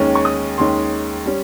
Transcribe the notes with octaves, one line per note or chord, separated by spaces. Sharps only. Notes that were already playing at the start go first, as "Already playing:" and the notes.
Already playing: D#2 D#3 G#3 C#4
C#6
D#6
D#2 D#3 G#3 C#4 C6
G3 C#4